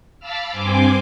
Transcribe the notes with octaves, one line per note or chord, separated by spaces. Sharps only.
F5 A5 B5 D6 E6 F6
G2 C4 G#5 C6 D6